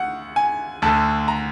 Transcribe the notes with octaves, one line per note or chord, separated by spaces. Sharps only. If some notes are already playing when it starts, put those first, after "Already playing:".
Already playing: D2 F#5
G#5
D2 D3 A5
A#5